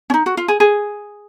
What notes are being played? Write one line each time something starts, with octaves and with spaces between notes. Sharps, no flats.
C#4
D#4
F#4
F4
G#4
G#4